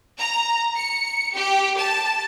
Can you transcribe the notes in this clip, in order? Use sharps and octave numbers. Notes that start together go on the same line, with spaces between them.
A#5
C#7
G4
A5